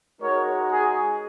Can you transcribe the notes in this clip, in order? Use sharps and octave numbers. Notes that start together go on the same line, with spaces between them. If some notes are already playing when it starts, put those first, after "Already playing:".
G#3 D#4 F#4 A#4 C#5
G#4